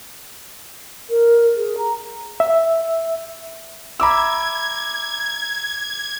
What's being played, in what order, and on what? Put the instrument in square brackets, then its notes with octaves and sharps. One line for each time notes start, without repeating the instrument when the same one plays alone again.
[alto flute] A#4
G#4
A#5
[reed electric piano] E5
[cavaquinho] E5 B5 [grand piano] A#5 D6 E6 [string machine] G#6